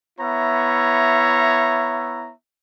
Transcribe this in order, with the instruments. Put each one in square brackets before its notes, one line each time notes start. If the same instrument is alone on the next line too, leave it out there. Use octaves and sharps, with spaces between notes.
[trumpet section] B3 E4 C#5 E5 A#5